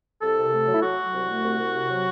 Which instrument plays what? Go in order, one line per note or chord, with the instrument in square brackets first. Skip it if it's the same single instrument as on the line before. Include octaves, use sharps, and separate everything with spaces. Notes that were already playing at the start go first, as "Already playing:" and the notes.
[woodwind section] C2 A4
C3
A3
F#3
E4
F#3 F#4
F#3
C2
A3
C2
C2
C3
F#3